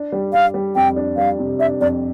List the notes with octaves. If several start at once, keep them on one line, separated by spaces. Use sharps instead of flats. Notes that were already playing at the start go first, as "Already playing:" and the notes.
Already playing: D4
G3
G3 F5
G3
F2 G5
D4
G3 F5
C3
D4 E5
F2 D5